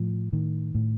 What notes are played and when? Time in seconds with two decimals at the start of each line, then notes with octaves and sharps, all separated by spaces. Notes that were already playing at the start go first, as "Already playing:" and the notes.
Already playing: A2 F3
0.33 A2 D#3
0.75 A2